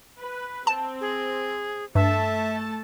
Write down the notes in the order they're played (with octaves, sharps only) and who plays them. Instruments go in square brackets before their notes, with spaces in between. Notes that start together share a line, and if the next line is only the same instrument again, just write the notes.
[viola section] B4
[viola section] C4 [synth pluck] A5
[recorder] G#4
[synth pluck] G2 [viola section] A3 A4 A5 [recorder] E5